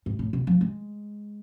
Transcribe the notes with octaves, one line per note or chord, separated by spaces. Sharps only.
G#2
A2
B2
F3
G#3